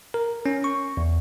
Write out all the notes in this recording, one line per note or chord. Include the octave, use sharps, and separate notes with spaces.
A#4
C#4
C#6
E2